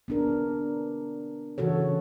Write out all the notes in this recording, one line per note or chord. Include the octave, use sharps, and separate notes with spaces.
B3 D4 A#4
C#3 E3 F#4 A4 C#5